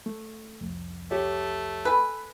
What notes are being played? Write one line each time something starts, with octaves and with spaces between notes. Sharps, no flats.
A3
C2 F2
A3 G4 C#5
A4 B4 G#5